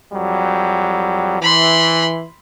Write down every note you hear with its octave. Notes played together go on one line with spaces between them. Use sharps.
F2 F#3 G3
E3 B5 C6